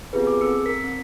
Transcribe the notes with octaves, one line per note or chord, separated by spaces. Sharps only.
B3 C4 F4 G4 G#4 B4
G#4 D6
C4 A4 E6 C#7
A#4 B6 C#7
C4